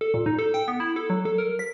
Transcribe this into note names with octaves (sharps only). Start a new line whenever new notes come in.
A4
A#2
D#4
A4
G5
B3
E4
A4
F#3
A4
A#4
B6